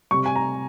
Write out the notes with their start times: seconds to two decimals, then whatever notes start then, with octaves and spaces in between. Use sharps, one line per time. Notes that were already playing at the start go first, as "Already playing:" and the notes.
0.11 C3 G3 C#6
0.26 G#5
0.36 A#5